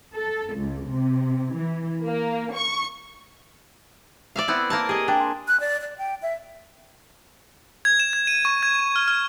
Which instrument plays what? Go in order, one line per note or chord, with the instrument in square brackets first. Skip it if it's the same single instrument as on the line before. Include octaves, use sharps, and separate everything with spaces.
[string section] A4
C#2
C3
E3
A#3
C#6
[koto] D5 E5 F5
B3 C4 E4
A#3 A#4 A5
[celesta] G4 [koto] G#4 D#5
[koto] D4 [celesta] G5
[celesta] C6
[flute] F#6
D5
D5
G5
E5
[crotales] G#6
E7
G#6
D#7
C#6
G#6
F6
F6